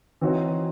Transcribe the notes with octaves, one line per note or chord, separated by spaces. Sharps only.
E3 C4 D#4 F#4 C#5